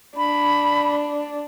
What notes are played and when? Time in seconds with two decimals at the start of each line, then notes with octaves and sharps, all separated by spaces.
0.17 D4 B5